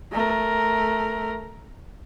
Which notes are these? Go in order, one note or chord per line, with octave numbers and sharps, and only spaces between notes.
A3 A#4